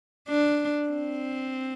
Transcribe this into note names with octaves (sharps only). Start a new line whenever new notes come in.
D4
C4